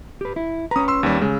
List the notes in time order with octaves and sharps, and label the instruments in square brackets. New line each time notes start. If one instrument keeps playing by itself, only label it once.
[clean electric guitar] G4 B4
E4
[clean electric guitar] C#4 B4 [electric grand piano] A#5 D#6
[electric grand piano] C6 E6
D#2 G3
[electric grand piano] C#3 [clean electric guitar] G#3